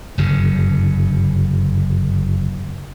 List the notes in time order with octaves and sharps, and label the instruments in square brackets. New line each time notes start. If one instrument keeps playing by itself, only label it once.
[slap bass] F#1 G2 D3